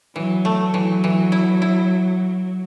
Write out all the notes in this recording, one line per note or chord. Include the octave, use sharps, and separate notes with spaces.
E3 F#3
A3
E3
E3
E4
E4